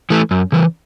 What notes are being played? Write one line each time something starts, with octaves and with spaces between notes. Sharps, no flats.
E3 A3
F#2
C#3 E3